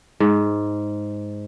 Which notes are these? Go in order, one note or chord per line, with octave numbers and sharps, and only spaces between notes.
G#2